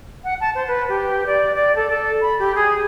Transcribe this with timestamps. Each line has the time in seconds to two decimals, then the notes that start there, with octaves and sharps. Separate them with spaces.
0.23 F#5
0.40 A5
0.54 C5
0.67 B4
0.88 G4
1.26 D5
1.54 D5
1.75 A4
1.89 A4
2.21 B5
2.39 G4
2.55 G#4